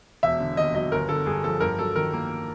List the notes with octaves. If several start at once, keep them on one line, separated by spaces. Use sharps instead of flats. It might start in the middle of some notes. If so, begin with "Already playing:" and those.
E1 E5
D3
D#2 D#5
F#3 D#5
G1 A#4
D3 A4
G2 G#4
F3 A4
G2 A#4
F#3 A4
D#3 A#4
A#3